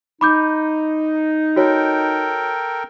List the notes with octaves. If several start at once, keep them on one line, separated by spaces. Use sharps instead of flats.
D#4 B5 D6 G6
F#4 A4 A#4 C#5 G5